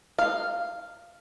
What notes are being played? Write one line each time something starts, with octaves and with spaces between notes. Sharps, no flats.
F5